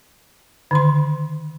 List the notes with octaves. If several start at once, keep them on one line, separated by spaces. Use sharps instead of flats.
D3 D#3 C6